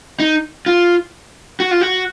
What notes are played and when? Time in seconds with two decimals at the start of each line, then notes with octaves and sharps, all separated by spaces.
0.20 D#4
0.66 F4
1.60 F#4
1.71 F4
1.81 F#4